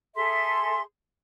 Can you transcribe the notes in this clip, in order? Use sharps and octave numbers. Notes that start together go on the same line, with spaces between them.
G#4 A4 E5 C6